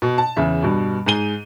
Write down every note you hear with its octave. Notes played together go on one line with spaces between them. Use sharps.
B2
A5
E2 C#3 E5
G2 B2
G#2 G#4 D#7 G7